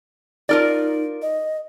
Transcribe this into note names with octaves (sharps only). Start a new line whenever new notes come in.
D#4 F4 A#4 D5
D#5